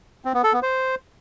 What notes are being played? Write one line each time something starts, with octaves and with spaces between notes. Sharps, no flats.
C4
B3
A4
B3
C5